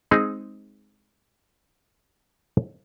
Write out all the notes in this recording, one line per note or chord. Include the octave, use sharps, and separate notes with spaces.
G#3 C4 D#4 G#4